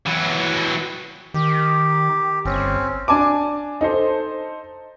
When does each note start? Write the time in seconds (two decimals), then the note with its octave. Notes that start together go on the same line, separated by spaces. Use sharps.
0.06 E3 F#3
1.34 D#3 G4
2.45 G1 C4 C#4
3.08 D4 G#5 A5 D6
3.81 D#4 A4 C5